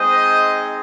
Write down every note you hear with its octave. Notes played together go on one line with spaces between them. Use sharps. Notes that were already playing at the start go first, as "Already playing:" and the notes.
Already playing: G#3 C4 D#4 C5 D#5